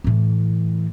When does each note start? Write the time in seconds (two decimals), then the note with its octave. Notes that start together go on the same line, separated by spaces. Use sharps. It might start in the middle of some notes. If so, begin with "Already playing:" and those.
0.04 A2 E3